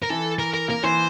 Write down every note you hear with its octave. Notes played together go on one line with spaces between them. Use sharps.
A#4
E3 A4
A#4
A#4
A#3 A#4
E3 C5